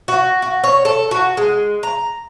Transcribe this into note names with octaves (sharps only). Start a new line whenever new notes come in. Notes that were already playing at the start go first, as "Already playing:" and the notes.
F#4
F#4
C#5
A4
F#4
G#3
A#5